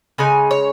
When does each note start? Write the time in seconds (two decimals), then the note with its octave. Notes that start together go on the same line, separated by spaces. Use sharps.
0.18 C#3 G#3 D#4 G#5
0.51 C#5